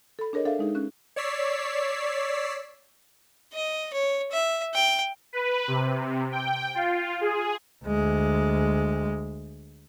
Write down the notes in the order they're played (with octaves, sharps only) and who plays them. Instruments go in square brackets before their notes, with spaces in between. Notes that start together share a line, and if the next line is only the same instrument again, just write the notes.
[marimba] A4 B5
D4 G#4 A#4 C#5 D#5
D4 A4 E5 F5
G#3 D#4 G#4
C#4 F#6
[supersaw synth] C#5 D5 E6 B6 C7
[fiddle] D#5
C#5
E5
G5
[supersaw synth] B4
C3
G5
F4
G#4
[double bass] D2 G#3